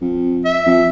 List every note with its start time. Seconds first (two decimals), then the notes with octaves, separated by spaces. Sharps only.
0.01 F2
0.45 E5
0.66 F2